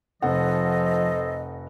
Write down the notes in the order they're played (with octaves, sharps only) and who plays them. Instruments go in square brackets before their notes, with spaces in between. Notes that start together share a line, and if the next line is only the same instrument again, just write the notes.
[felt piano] F1 F#5 [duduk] F3 [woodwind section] A4 C5 D#5